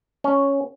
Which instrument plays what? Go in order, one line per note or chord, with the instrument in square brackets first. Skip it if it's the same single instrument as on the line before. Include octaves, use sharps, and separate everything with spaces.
[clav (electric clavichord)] C#4